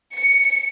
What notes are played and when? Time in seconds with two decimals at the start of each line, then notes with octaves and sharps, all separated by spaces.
0.15 C#7